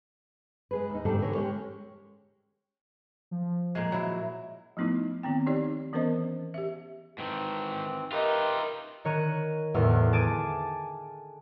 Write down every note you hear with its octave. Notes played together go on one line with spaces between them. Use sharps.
G#3 G#4 B4
D#2 D#4
G#2 D3 D#3 G3 A3 A4
D3 E3 G3 G4 A#4 C#5
G#3 C#4 G4 C#5
F3
A#2 G#3
F#3 E4
F3 A3 B3 D#4 E4
D#3 B3 C4 G5
D#4 G4 C#5 D5
E3 B3 C#4 A#4 C5 D#5
G4 E5
G#2 D#3 E3 C4
D#4 F4 G4 A#4 B4 D#5 E5
D#3 C#5 A#5 F#6 D#7
G1 E2 A2 F6
G#4 A5 D6 A6 D7 D#7